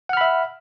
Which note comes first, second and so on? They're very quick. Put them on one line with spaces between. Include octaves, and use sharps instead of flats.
F#5 F6 B5 E5